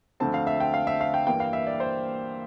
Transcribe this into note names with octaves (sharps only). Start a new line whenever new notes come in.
D2 D3 F3 A3 C4 A5
F5
E5
G5
F5
E5
F5
G5
G2 E3 A#3 G5
F5
E5
D5
C5